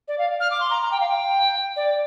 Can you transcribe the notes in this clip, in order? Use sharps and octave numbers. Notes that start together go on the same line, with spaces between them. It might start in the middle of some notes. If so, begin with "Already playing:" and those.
D5
F5
F6
D6
C6
A#5
A#5
G5
F5
G5
D5